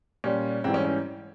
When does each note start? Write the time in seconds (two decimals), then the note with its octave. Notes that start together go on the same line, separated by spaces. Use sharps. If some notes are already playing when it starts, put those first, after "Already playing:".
0.24 A#2 G3 C#4
0.64 G#2 E3 G3 C4
0.74 C#4
0.85 C#4